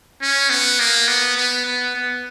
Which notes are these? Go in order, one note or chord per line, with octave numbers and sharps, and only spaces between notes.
C#4
B3
A#3
B3
B3
B3
B3